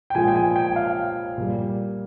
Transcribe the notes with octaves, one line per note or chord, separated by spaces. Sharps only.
G5
A#2 F3 G#3 G#5
G5
G#5
G5
F5
A#2 G3